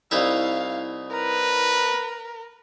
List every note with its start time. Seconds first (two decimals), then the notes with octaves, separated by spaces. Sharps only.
0.11 C2 D#4 E4 F5
1.10 A#4 B4